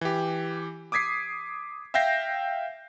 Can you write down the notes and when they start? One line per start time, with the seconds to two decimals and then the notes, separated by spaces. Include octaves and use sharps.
0.01 E3 G4
0.92 D6 D#6 G#6 B6 C7
1.94 E5 F5 G5 G6 A#6 C7